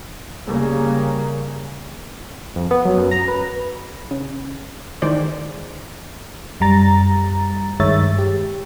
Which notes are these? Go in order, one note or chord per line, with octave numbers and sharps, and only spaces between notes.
C#3 G3 A#3
F2
B3
F#3
F#2
A#5
B4
C#3
D#3 E3 G#3 C5 D5
F#2 G3 A#5 A6
G2 D#3 G#3 C#5 E5 A6
G4